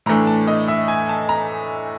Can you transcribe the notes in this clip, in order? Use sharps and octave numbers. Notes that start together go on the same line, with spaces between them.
A2 E3 A3 D4 A#5
A5
D#5
E5
G#5
A5
A#5